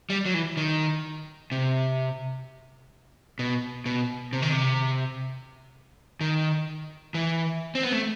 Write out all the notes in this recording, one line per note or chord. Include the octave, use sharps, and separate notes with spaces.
G3
F#3
E3
D#3
C3
B2
B2
C3
D#3
C3
D#3
E3
C4
B3
A3